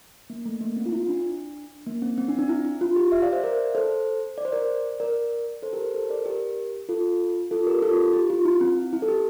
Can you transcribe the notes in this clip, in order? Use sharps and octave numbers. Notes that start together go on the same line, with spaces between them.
A#3
A3
A#3
C4
F4
E4
D4
A#3
C4
C4
D4
C4
D4
E4
E4
F4
G4
E5
D5 F5
C5 E5
A#4 D5
A4 C5
D5
C5
A#4 D5
A#4 D5
A4 C5
G4 A#4
A4 C5
A#4 D5
G4 A#4
F4 A4
F4 A4
G4 A#4
F4 A4
G4
F4
E4
C4
E4
A4
G4